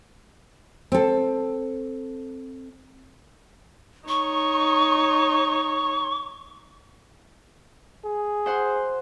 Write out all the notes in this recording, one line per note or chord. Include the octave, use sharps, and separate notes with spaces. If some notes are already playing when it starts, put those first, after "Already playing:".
C4 A4
D#4 C#5 C#6
G#4
C5 F#5 C6